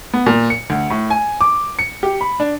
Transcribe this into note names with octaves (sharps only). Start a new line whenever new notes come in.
B3
A#2
C#7
D2
A2
G#5
D6
C#7
G4
B5
D4